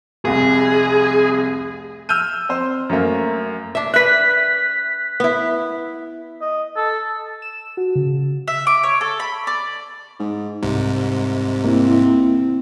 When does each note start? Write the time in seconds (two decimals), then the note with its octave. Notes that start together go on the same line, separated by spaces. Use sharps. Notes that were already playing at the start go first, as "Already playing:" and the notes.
0.25 F1 C2 G#4
2.09 E6 F6 G6 D#7
2.49 C4 C5
2.89 F#2 A3 A#3
3.75 D4 E5
3.94 B4 E5 F#6 B6
5.20 B3 E4
6.41 D#5
6.76 A4
7.42 E7
7.77 F#4
7.95 C#3
8.48 E5
8.67 D6
8.83 C#5
9.01 A4
9.20 B5
9.47 D5
10.19 G#2
10.63 C2 G#2 C3
11.64 A#3 C4 E4